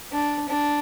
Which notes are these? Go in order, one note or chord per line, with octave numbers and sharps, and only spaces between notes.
D4
D4